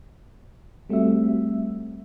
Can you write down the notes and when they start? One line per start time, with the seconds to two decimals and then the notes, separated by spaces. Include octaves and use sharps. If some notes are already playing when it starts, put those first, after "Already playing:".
0.89 G3 A3 C4 F#4 E5